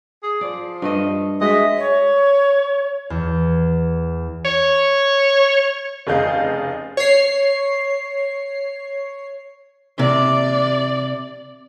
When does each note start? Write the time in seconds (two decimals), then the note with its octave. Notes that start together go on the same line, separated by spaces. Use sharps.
0.23 G#4
0.41 F3 D5
0.82 G2 A3 D#5
1.41 G#3 F#4 D#5 E5
1.77 C#5
3.10 E2
4.45 C#5
6.07 F1 C#3 G#4 D#5 F5 G6
6.97 C#5 C7
9.99 C3 D5